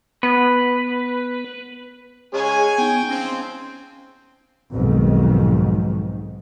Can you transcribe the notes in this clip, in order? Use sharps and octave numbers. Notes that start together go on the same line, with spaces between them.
B3 B4
G#3 C#4 G#4 C#5 G#5
B3 D#4 G5
F3 G#3 C4 C#4
B1 F2 G#2 D#3